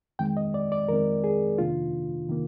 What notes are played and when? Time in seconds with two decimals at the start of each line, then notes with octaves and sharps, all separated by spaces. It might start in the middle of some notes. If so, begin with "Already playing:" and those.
0.19 F2 D#3 G#3 C4 G5
0.37 D#5
0.54 D5
0.72 D5
0.88 F2 D#3 G#3 C4 A#4
1.24 G#4
1.58 F2 C3 D#3 A#3 D4 F4
2.29 C3 D#3 A#3